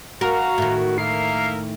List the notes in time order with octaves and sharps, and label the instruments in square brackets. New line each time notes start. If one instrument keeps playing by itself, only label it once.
[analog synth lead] F#4 [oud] A#4 [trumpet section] F5 A#5
[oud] A2 D#3
[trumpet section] A#3 A#4 E5 [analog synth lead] C7